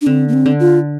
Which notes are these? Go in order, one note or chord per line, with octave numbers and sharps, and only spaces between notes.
D4
D3 C4
A#3
C4
D3
F4